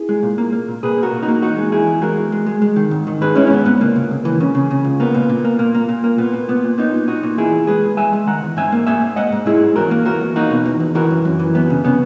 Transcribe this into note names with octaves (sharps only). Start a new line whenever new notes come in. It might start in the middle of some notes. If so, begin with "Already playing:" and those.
Already playing: E4 G#4
G#3
A#2
A#3
A#3
A#2
A#2 G#4 B4
A#3
F#4 A#4
A#2
D#4 F#4
A#3
E2 D#4 F#4
G#3
E2 E4 G#4
E2
G#3 F#4 A#4
E2
G#3
G#3
G#3
D#3
G#2
D#3
G#2 G#4 B4
G#3 C#4 E4
C#4
G#2 B3
G#2 B3
C#2 A#3
C#2
C#2
E3
C#3
C#3
C#3
C#2
A#3 B3
A#2
A#2
A#3
A#2 A#3
A#3
A#2
A#3
A#2 B3
A#2
A#2 B3
A#2
A#2 B3 D#4
A#2
A#2 D#4 F#4
A#2
E2 E4 G#4
E2
G#3 G#4 B4
E2
G#3 E5 G#5
G#3
D#3 F#5 A#5
E2
G#2 E5 G#5
A#3
A#3 E5 G#5
G#2
G#2 D#5 F#5
G#2
G#2 E4 G#4
G#2
E2 F#4 A#4
A#3
E2 F#4 A#4
E2
A#3 D#4 F#4
B2
E2
E2
E3 F#4 A#4
F#2
F#2
E3
F#2 B3
C#3
C#3 B3